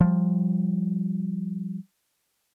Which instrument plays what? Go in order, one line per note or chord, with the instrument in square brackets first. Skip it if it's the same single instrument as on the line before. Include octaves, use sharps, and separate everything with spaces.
[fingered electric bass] F3 G3